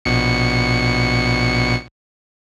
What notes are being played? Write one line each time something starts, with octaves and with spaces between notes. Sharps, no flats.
A#1 B2 C#7